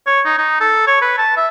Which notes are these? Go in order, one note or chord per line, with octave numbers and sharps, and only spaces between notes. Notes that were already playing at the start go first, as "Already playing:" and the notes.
C#5
D#4
D#4
A4
C#5
B4
A5
E5